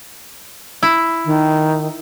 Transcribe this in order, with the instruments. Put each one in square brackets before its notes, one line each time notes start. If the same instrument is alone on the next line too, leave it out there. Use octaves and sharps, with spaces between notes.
[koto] E4
[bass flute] D#3